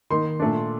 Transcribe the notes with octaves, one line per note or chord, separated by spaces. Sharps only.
D#3 A#3 D#4 C6
A#2 A3 D4